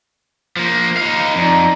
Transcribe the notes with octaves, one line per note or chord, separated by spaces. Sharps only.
F3 A#3
D#4 F5
F2 D#4 D5 A#5